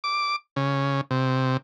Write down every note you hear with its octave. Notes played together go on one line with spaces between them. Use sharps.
D6
C#3
C3